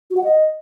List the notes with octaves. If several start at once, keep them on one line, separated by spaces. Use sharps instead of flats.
F#4
F#5
D#5